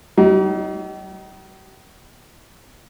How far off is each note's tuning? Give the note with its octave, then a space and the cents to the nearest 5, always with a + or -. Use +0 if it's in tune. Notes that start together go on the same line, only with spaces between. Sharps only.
G3 -45 D#4 +15